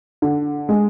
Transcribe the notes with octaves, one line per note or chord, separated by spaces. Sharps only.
D3
G#3